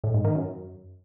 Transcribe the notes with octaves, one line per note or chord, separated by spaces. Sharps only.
A2
G#2
D#3
F#2